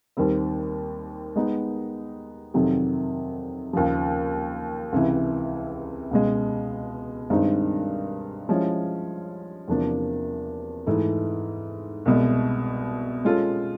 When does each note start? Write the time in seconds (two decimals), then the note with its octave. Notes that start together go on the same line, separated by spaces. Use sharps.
0.17 D#2 D#3 G3 C4
1.35 G#3 B3 D#4
2.54 F2 C3 D#3 F#3
3.73 D#2 C#3 F3
4.92 C#2 C3 E3
6.11 C#2 B2 G#3
7.30 G2 D#3 G#3 C4 D#4
8.49 F3 G#3 C#4 E4
9.68 E2 C3 F3 A#3 D4
10.86 G#2 E3 A3
12.06 C2 B2 G#3
13.24 G#3 C#4 F4 A4